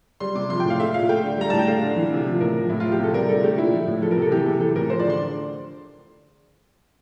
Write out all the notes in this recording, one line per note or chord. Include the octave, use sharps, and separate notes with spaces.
G3 C6
C3 D6
F3 C6
G5
A2
F5
A3 E5
A#2 F5
A3 G5
D3
G3 A#5
A2 A5
G5
A3 F5
D3
E3
C3
F3
A2 A#4
F3
A2 E4
F3 F4
G4
C3 A4
G3 A#4
D3 A4
A3 G4
A#2 E4
F3
A2
F3 A4
A#4
C3
A4
E3 G4
C3 A4
E3 A4
A2 A#4
F3 C5
D5
D3
C6